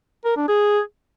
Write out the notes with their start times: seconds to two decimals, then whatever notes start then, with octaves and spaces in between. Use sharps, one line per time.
0.25 A#4
0.37 D4
0.49 G#4